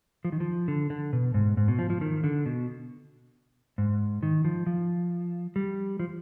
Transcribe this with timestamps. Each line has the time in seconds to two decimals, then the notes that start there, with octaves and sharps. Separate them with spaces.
0.25 F3
0.32 D#3
0.40 F3
0.68 D3
0.90 D3
1.13 B2
1.34 G#2
1.57 G#2
1.68 B2
1.79 F3
1.90 F3
2.01 D#3
2.24 D3
2.46 B2
3.78 G#2
4.23 D#3
4.45 F3
4.67 F3
5.56 G3
6.00 F3